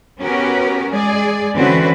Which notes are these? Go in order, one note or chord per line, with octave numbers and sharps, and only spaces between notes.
B3 C#4 F#4 G4 A#4 B4
G#3 G#4 D5
D3 E3 C4 C#4 F#4 B4